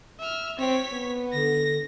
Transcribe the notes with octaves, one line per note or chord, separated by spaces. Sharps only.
E5 F6
C4 C#5 B6
B3
D3 A#6